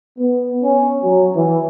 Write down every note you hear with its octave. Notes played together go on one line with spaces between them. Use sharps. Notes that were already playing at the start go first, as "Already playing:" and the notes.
B3
C#4
F#3
E3